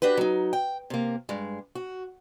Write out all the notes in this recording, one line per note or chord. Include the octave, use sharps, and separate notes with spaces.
D4 F#4 G4 B4
F#3 D#4
G5
C3 A#3
G2 G#3
F#4